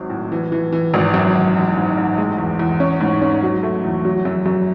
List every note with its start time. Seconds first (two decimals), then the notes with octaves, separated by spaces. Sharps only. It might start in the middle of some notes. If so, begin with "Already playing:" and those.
Already playing: G#1 F#3 C4
0.10 A2
0.32 E3
0.52 E3
0.72 E3
0.94 G#1
1.14 F#2
1.35 G#1
1.56 A1
1.77 G#2
1.98 A1
2.18 G#3
2.38 E2
2.59 E2
2.80 C#4
3.00 G#2
3.22 C#4
3.43 F#3
3.63 A3
3.84 E2
4.05 F#3
4.25 F#2
4.46 F#2